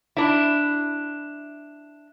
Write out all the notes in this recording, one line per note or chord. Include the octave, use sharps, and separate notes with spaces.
D4 E4